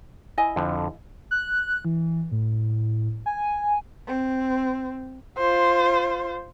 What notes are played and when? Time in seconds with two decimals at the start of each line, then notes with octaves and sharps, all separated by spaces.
0.37 E4 D#5 G#5
0.56 F2 D3 F3
1.31 F#6
1.85 E3
2.32 A2
3.26 G#5
4.08 C4
5.38 F4 C5